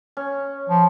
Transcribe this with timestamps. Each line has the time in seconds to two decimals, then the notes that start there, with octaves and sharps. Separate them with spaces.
0.17 C#4
0.69 F3